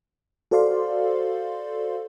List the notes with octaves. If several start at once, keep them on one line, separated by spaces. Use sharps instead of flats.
F#4 A4 C5 D5 F5 C6